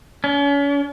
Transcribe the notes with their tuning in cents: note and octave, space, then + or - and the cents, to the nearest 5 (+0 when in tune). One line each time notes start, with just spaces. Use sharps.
C#4 +40